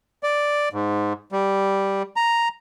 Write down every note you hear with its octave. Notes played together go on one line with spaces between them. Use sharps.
D5
G#2
G3
A#5